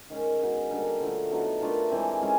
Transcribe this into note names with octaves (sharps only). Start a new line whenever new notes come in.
D#3 G#3 C#4
G#3 B3 D#4 F#4
D3 G3 A#3 D4
D3 F3 A3
F#3 B3 D#4
A3 D4 F4 A#4
E3 G#3 C4 E4
G#3 C#4 F4 G#4